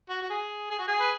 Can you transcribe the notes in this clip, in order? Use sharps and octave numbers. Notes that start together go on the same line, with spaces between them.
F#4
F#4
G#4
G#4
F#4
G#4
B4